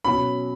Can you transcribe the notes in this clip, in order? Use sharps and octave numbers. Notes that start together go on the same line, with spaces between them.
B2 F#3 C#4 B5